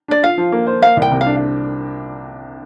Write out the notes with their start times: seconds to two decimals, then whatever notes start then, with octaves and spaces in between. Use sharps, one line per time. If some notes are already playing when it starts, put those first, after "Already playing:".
0.08 D4 D5
0.23 F4 F5
0.38 F3
0.52 A#3
0.67 C5
0.82 A#3 F5
0.97 C2
1.02 G5
1.12 C3
1.21 F5
1.26 D4